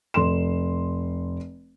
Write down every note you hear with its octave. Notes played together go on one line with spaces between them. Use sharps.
F1 C6 E7